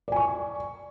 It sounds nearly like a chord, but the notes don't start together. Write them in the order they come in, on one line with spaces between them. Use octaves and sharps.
D5 G#5 C#6